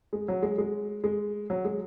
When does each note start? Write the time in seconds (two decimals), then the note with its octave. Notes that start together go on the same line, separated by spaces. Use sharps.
0.13 G#3
0.28 F#3
0.42 G#3
0.58 G#3
1.04 G#3
1.50 F#3
1.65 G#3